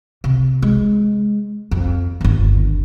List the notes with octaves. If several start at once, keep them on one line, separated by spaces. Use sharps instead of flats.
C3
G#3
F2
G1 D#2